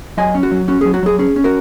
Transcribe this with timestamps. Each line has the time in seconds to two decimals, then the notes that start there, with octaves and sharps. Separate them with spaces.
0.17 F#3 D#5 G#5
0.35 C#4
0.43 F#4
0.51 F#3
0.68 C#4 F#4
0.81 G#4
0.85 F#3
0.94 F#4
1.03 F#3 G#4
1.19 C#4 G#4
1.36 C#4
1.44 F#4 A#4